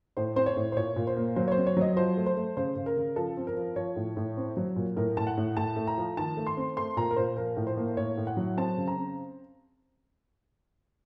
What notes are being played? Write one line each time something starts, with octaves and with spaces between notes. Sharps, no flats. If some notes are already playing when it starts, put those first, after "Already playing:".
A2 C5
C4 C5
C#5
A2
C5
A#2 C#5
A#2
C5
A#3
F#3 C5
C#5
C5
C4
C#5
F#3 D#5
F3 C5
A3
C5
A3
C#3 C5
C#3
A#4
C#3
F3 A4
C4
A#4
F3
F3 C#5
A2
A2
C4
F#3
A#2
A2 A#4
A2 A5
F#5
A2
A2 A5
A3
A#5
F3
D#3 A5
A3
C6
C4
A3 C6
A#2 A#5
A#4
A#2 C5
F3 A#4
A2
C5
A#3
A2 C#5
A2
F#5
F#3
C4 A5
C#3
A#5
C4